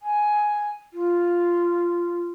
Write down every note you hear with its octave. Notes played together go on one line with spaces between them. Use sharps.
G#5
F4